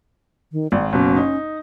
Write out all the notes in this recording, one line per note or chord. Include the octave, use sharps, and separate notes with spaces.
D#3
G#1 D5
F#1 B2 C#4
D#4